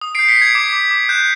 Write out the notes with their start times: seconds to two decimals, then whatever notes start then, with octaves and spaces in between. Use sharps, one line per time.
0.01 D#6
0.15 G6 C7 D7
0.29 B6 C#7
0.37 G6 G#6
0.55 D6 G#6
0.73 D6
0.91 D6
1.09 F#6 G6